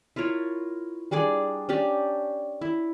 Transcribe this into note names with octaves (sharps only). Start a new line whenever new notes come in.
E4 F4 A#4 C#5
G3 D4 G#4 D5
C#4 D4 G4 D5
E4